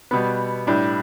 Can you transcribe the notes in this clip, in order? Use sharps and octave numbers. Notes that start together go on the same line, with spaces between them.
B2 G3 B3
A2 G3 D4